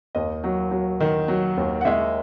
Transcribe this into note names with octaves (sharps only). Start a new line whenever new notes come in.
D#2 D#5
F#3
F#3
D#3
F#3
D#2
F#5
G#3 E5